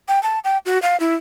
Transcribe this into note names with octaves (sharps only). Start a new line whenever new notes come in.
G5
A5
G5
F#4
F5
E4